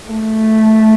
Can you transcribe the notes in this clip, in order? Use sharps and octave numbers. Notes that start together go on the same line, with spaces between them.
A3